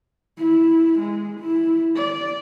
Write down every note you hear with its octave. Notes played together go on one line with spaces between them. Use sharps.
E4
G#3
E4
D5